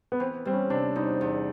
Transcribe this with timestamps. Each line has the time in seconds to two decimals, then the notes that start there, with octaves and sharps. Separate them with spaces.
0.12 B3
0.20 E3 C4
0.45 G3 C4
0.53 C#4
0.70 C3 D4
0.96 E2 D#4
1.21 E2